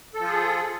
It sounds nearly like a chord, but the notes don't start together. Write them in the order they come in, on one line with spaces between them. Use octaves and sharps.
A4 F3 F4 G#4